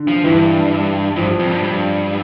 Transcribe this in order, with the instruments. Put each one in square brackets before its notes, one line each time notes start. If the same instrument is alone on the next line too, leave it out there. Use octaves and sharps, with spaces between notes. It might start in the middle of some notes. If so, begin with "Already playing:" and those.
Already playing: [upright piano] D3
[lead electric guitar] F3
[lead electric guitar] G2 [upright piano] E3
[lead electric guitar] G2 [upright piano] F3
[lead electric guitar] F2
G2
G2